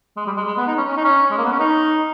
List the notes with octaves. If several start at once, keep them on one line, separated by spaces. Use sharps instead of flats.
G#3
G3
G#3
G#3
B3
D#4
C#4
C#4
D#4
C#4
G#3
A#3
B3
C#4
D#4